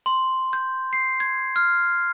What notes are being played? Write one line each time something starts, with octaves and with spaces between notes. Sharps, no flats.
C6
G6
C7
G#6
F6